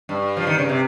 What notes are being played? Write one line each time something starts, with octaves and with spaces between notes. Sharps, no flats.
G2
F3
D#3
C#3
C3